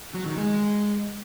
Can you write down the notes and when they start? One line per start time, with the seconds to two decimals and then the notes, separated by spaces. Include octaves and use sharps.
0.14 F#3
0.26 D#3
0.37 G#3